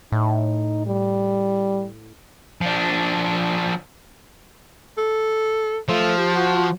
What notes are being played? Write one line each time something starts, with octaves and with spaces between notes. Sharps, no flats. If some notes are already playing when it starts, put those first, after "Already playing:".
A2 D#4
G3
F3 D4
A4
F3 A3
G4
F#4